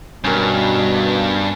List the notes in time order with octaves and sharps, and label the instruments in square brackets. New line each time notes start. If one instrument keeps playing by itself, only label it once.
[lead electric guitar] G2 [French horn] B2 [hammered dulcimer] C#4 A#4